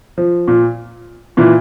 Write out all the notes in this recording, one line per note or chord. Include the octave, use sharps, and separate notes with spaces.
F3
A#2
A#2 E3